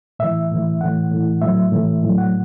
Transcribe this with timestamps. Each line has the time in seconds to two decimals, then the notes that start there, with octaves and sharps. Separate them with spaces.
0.19 A2 E3 E5
0.51 A2 E3
0.81 A2 E3 F#5
1.11 A2 E3
1.42 A2 F#3 E5
1.72 A2 E3
2.03 A2 F#3
2.18 F#5